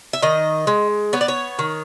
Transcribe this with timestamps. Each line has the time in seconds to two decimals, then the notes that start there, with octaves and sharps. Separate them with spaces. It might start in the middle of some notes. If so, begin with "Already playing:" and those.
0.13 E5
0.22 D#3 D#5
0.67 G#3
1.13 B3 C#5
1.21 D5
1.28 C#5
1.59 D#3